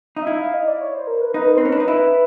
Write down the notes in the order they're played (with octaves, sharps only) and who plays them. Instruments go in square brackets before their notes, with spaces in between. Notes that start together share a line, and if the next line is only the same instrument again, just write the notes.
[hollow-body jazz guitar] D#4
[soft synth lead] E5
[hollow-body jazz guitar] E4 [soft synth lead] F5
[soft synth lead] F5
D#5
D5
C#5
C5
A#4
B4
[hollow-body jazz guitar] D#4 [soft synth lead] B4
[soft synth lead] A#4
[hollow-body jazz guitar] C4 [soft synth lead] C5
[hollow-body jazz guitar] C#4 [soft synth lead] B4
[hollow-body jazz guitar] D4
[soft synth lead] B4
[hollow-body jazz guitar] D#4
[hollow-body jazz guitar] E4 [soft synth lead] B4